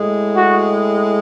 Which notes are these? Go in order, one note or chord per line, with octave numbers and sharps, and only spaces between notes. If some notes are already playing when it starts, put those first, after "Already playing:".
Already playing: A2 G#3
F#4